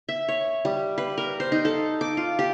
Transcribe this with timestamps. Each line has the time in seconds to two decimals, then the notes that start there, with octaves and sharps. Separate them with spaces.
0.09 E5
0.28 C#5
0.65 G3
0.98 B4
1.18 A#4
1.40 C5
1.52 D#4
1.65 A4
2.01 D6
2.17 F4
2.39 G4